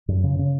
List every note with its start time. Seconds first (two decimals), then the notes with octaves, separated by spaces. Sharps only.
0.08 F#2
0.24 C#3
0.39 C#3